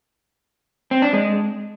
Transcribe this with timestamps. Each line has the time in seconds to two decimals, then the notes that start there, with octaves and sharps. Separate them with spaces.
0.91 C4
1.02 D4
1.13 G#3